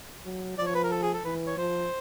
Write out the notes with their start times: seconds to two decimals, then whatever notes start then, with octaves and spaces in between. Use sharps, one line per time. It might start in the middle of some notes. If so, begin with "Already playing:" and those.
0.25 F#3
0.58 F3 D5
0.66 C#5
0.75 B4
0.84 A#4
0.91 A4
1.02 G#4
1.14 A4
1.24 E3 B4
1.46 C#5
1.57 F3 C5